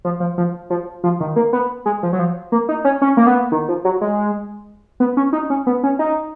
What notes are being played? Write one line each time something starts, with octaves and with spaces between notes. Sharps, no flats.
F3
F3
F3
F3
F3
D#3
A#3
B3
G#3
F3
F#3
F3
A#3
D#4
C#4
C#4
A#3
B3
D#3
F3
F#3
G#3
B3
C#4
D#4
C#4
B3
C#4
D#4